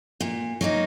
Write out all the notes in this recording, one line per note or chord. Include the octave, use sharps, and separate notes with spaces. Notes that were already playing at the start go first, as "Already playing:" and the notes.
A#2
F#3 A#3 D#4